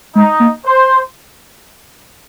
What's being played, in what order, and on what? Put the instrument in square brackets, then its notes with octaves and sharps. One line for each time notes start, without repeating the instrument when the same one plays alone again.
[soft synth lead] G#3 [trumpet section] D#4
[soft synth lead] A#3
[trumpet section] C5